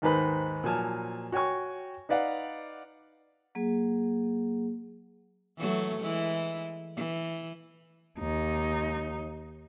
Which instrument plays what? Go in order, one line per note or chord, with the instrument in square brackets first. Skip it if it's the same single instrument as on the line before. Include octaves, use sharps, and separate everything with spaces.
[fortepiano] D#2 G#2 D#3 B4 C5 B5
A#2 F3 F#3 G#5 A5 F6
F#4 C#5 G5 G#5 C#6
D#4 B4 D5 F5 F#5
[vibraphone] F#3 A#3 G#4
[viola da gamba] E3 F#3 A3
E3 G#3 E4
E3
[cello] D#2 D#4